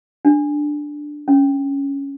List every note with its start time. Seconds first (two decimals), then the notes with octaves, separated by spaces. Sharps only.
0.25 D4
1.28 C#4